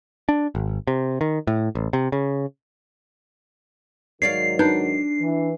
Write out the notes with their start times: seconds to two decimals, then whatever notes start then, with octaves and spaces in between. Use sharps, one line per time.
0.29 D4
0.55 G#1
0.87 C3
1.21 D#3
1.47 A2
1.75 A1
1.93 C3
2.12 C#3
4.22 G#2 D#3 F#3 C#5 D5 F5 C7
4.59 D4 D#4 B4 G6
5.20 E3